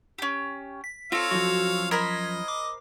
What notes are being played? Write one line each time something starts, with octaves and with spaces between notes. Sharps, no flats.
C#4 G4
B6
C4 F4 A4 C#5 F5
F#2 F3 F#4
A#4 C5 D#5 B5 G#6
D6